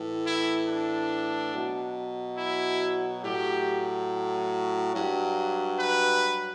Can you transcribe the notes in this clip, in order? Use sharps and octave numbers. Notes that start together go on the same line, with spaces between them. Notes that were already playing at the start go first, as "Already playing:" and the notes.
Already playing: A2 E3
E4
D4
B2 F#3
E4
A2 F#3 G4
G2 F#3
B4